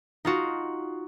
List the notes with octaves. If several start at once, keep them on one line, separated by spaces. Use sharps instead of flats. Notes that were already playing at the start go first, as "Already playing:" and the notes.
D#4 F4 F#4